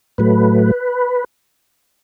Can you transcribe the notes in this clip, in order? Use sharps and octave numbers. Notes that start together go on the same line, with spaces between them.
A2 F#3 A3 B4